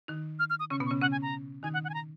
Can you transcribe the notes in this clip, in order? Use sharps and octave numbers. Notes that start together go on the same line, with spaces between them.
D#3 D#4
F6
F6
D#6
C#3 C#4 C#6
B2 B3
C#6
C#3 C#4
C#3 C#4 F#5
G#5
A#5
D#3 D#4 G#5
F#5
F#5
G#5
A#5